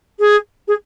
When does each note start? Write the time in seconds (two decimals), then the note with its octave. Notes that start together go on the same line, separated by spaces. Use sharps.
0.19 G#4
0.67 G#4